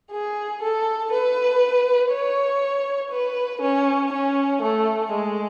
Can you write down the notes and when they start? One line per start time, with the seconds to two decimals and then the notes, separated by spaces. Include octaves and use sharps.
0.12 G#4
0.62 A4
1.12 B4
2.12 C#5
3.12 B4
3.62 C#4
4.12 C#4
4.62 A3
5.12 G#3